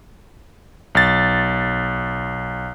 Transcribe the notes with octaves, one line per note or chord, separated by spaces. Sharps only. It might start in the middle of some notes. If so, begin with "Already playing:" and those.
B1 A6